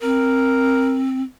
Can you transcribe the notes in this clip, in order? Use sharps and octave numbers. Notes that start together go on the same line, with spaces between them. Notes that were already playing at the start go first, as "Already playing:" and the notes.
C4 A#4